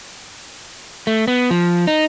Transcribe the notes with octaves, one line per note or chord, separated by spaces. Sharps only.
A3
B3
F3
D#4